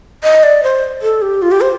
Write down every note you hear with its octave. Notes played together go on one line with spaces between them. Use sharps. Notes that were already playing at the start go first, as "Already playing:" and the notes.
D#5
D5
C5
A4
G4
F4
G4
C5